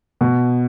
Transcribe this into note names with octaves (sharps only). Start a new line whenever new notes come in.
B2